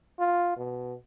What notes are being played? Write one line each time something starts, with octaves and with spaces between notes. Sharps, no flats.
F4
B2